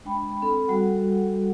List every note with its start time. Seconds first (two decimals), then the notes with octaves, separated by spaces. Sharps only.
0.05 G#3 D4 G5 B5
0.42 C4 A4 B5
0.68 G3 F#4 A4 F#5